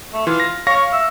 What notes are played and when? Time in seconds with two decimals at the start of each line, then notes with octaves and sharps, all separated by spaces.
0.13 A3
0.27 E3 F4
0.40 A#6
0.67 C#5 F5 C#6 A#6
0.93 E5